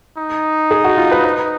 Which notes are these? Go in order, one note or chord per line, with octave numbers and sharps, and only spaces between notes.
D#4
G#4
F#4
F4
B4
B4